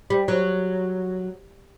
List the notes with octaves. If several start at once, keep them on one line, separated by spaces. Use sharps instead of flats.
G3
F#3